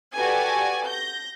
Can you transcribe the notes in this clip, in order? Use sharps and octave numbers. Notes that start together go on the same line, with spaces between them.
F#4 G4 A4 B4 D5 G#5
G6 A#6